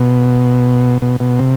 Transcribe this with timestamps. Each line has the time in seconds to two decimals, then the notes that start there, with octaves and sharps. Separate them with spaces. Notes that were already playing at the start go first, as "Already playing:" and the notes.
Already playing: B2
1.02 B2
1.20 B2
1.39 C3